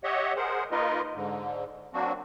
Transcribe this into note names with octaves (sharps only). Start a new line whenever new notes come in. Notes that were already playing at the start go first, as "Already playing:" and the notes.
G4 C#5 D#5 E5 F#5
G#4 A#4 C5 F#5
A#3 D#4 F4 A#4 B4 D#5
G#2 D3
F#3 A#3 C4 D4 F#4